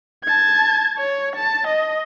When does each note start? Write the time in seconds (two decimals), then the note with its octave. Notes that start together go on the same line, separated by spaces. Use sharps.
0.24 A5 G#6
0.98 C#5
1.36 A5
1.67 D#5